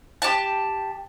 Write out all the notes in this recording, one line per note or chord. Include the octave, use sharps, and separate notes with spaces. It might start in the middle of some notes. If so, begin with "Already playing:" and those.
G4 A5